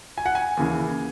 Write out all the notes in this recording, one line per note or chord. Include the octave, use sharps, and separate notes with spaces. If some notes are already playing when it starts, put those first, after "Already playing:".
G#5
F#5
G#5
D#2 C#3 E3